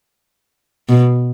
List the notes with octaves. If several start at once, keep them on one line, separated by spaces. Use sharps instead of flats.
B2